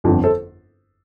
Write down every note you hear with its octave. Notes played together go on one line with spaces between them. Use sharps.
G1 F2 D3 F3
A4 C5